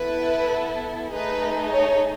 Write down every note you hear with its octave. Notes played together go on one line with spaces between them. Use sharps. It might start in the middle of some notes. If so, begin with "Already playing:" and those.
Already playing: B3 E4 A4 B4
A3 D#4 G#4 B4
C#5